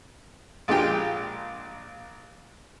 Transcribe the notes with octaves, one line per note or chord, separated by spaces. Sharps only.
A#1 G#3 D4 F4 G4 G5